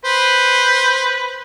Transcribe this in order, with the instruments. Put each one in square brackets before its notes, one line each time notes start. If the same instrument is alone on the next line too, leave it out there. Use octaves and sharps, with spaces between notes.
[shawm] B4 [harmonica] C5